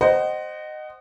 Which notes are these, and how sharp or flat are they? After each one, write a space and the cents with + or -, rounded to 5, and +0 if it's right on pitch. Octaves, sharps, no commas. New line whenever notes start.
C5 +0 D#5 -15 F#5 +25